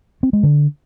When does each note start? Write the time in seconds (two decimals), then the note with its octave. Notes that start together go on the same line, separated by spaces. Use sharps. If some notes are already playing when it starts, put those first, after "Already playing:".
0.23 C4
0.33 G#3
0.43 D3